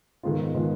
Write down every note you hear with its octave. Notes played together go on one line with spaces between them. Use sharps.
G#2 D#3 G#3 B3 F4
D#3 G#3 B3 F4